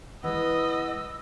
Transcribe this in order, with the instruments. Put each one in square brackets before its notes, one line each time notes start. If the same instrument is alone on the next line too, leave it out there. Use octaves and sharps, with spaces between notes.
[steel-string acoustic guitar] E3 G#3 [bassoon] B3 [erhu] D#5 [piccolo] E6